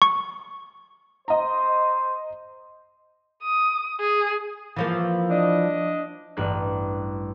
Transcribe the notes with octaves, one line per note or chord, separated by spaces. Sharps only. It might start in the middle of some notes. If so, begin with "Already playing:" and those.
C#6
C5 D#5 A#5
D#6
G#4
E3 F3 A#3
D4 D#5
A1 G2 F#6